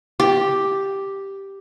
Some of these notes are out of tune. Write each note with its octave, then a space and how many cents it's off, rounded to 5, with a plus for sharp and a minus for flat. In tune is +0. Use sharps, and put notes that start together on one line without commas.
G4 +0